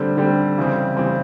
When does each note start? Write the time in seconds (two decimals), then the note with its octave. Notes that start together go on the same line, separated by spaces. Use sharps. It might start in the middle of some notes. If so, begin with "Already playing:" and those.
Already playing: D3 G3 C4
0.17 D3 G3 C4
0.58 C#3 E3 G3 C4
0.97 C#3 E3 G3 C4